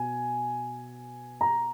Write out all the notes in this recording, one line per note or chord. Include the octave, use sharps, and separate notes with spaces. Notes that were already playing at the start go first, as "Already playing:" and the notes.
Already playing: B2 G#5
A#5